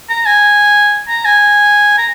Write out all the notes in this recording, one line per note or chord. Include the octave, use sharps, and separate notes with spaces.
A#5
G#5
A#5
G#5
A#5